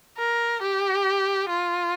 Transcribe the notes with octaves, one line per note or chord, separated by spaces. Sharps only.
A#4
G4
F4